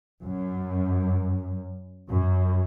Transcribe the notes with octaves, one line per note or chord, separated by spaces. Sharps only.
F#2
F#2